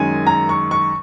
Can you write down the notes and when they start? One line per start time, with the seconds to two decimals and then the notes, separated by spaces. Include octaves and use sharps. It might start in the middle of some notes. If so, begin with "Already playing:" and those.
Already playing: F#2 D#3 G#3 G#5
0.27 A#5
0.49 C#6
0.71 C#6